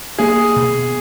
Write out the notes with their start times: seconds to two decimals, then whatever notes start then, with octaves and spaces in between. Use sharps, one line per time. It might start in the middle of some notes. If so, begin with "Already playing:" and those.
0.18 A#3 G#4
0.56 B2